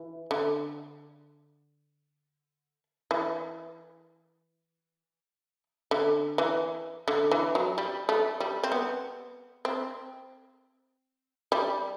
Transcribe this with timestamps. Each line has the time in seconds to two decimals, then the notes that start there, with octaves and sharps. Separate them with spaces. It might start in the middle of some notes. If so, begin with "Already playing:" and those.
Already playing: E3
0.31 D3
3.11 E3
5.91 D3
6.38 E3
7.08 D3
7.31 E3
7.55 F#3
7.78 G3
8.09 A3
8.40 G3
8.63 C4
8.72 B3
9.65 C4
11.52 G3